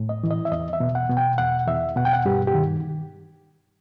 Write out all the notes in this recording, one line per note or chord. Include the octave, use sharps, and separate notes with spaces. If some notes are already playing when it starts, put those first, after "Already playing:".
Already playing: A2
D#5
E3
D#5
E5
E2 D#5
E5
B2
F#5
B2
G5
E2 F#5
E2 E5
B2 F#5
G5
F#5
G2 G4
G4
D#3